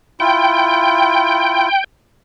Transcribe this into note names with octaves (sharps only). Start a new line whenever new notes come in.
E4 F4 G5